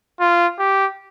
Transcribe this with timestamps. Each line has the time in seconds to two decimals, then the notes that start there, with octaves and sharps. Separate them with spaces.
0.20 F4
0.59 G4